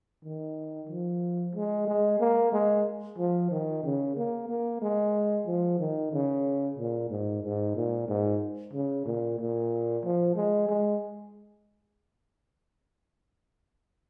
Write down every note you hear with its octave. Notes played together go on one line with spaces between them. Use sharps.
D#3
F3
G#3
G#3
A#3
G#3
F3
D#3
C#3
A#3
A#3
G#3
F3
D#3
C#3
A#2
G#2
G#2
A#2
G#2
C#3
A#2
A#2
F3
G#3
G#3